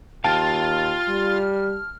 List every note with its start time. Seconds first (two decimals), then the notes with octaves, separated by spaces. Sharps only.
0.24 D#2 F4 F5 G5 A5 F6
1.08 G3